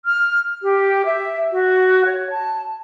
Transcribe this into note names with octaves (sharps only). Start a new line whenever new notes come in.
F6
G4
E5
F#4
C#5
A5